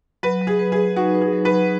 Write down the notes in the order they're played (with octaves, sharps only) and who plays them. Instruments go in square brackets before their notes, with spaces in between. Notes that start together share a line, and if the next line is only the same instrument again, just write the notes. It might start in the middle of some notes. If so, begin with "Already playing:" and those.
[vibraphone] F#3 [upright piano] B4
[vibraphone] F#3
[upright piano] G#4
[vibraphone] B4
[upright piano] G#4
[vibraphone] B4
[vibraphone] D#4 [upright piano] F#4
[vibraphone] B4
[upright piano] G#4
[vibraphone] F#3
[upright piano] B4
[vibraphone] F#3